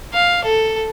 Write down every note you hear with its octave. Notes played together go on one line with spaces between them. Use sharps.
F5
A4